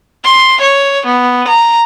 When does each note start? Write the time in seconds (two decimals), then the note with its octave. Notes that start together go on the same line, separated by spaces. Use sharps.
0.24 C6
0.61 C#5
1.06 B3
1.48 A#5